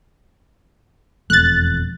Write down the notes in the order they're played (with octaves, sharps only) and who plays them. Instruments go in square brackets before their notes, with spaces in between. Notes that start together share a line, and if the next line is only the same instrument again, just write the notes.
[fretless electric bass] E1 F2 A3 [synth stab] F#6 A6